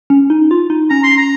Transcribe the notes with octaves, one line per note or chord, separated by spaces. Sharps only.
C#4
D#4
F4
D#4
C#4 A#5
C6
A#5